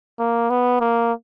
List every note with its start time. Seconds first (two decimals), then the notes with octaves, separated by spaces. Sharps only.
0.19 A#3
0.50 B3
0.81 A#3